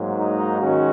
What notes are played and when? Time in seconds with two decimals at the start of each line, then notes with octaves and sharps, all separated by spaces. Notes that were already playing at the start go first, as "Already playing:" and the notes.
Already playing: G#2 F#3 A#3
0.19 D#4
0.60 D#3 G#3 C#4 F#4